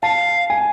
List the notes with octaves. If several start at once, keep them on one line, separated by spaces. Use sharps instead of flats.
F5 A5
G#5